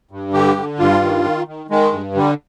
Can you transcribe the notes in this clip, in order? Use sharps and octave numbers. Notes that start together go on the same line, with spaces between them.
G2
D3 G4
D3
G2 F4
D#3
D#3
D#3
D#3 G#3
G2
D3 G3